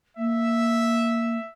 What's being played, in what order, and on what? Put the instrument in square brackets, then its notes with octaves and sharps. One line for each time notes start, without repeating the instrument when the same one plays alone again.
[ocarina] A#3 [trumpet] E5